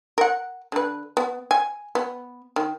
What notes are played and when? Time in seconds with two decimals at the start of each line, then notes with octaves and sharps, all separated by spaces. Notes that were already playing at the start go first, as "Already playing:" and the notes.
0.18 A#4 F#5
0.72 D3 B4
1.17 B3
1.51 G#5
1.95 B3
2.56 D#3